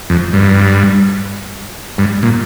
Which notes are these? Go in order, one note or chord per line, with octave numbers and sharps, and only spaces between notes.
F2
G2
G2
A#2